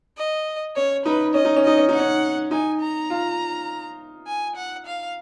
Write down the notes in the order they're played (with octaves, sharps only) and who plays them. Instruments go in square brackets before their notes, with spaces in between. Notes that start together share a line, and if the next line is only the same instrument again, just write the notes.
[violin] D#5
[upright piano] C#4 [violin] C#5
[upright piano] D#4 [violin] B4
[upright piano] C#4 [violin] D#5
[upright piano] D#4
C#4
[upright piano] D#4 [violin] D#5
[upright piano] C#4
[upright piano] D#4 [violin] F#5
[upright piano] C#4
[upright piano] D#4 [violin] G#5
[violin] A#5
[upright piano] F4
[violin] G#5
F#5
F5